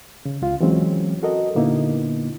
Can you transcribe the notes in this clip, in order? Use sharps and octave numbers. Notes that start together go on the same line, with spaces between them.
C#3
C#2 F4 F5
E3 F#3 G#3 C4 C#4
F#4 A4 A#4 D#5
A#2 D3 A#3 B3 D#4 E4